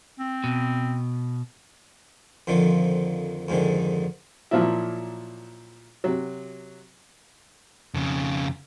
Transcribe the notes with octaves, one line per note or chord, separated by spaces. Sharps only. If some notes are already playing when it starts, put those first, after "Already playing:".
C4
B2
F2 D3 D#3 F3
F2 G#2 D3 D#3
A#2 F3 F#3 A#3 E4
C3 F#3
F2 C#3